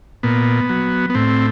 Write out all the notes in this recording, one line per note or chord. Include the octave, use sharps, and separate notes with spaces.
A#2 B3
F#3
B3
A2 C4